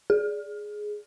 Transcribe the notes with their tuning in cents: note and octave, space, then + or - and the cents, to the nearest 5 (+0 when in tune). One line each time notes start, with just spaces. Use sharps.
G#4 +5